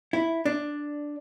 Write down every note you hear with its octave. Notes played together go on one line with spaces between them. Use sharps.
E4
D4